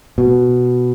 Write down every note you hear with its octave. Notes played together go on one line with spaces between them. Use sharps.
B2